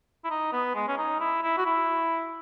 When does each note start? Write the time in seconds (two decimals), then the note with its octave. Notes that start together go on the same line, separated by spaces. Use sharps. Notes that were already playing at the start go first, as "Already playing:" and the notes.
0.25 E4
0.31 D#4
0.52 B3
0.75 G#3
0.88 C#4
0.98 D#4
1.20 E4
1.43 E4
1.58 F#4
1.66 E4